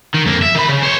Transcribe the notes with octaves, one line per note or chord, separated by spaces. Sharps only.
D#3
F2 A#3
E5
D#3 B5
C#3
C5 C#5